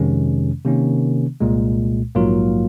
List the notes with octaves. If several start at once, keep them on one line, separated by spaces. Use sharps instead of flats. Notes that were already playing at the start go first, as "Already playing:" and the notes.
Already playing: F2 C3 D#3 G#3 C#4
C3 D#3 A#3 C#4
C2 A#2 G#3
A#1 G#2 F#3 A#3 F4